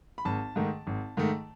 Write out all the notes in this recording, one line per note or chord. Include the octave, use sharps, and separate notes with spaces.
B5
G#1 A5
G#2 D#3 A3
G#1
G#2 D#3 A3